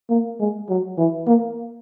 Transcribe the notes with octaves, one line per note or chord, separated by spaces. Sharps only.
A#3
G#3
F#3
E3
A#3